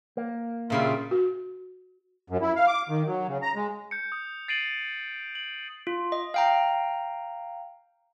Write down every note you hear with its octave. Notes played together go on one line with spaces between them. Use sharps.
A#3
A#2 C#3 G3 F4 E5 F5
F#4
F#2
E4
F5
D6
D#3
F#3
C#3
A#5
G#3
G6 C#7
D#6
A6 C7 D7 D#7 F#7
F#7
F4
D#5
F5 G5 A#5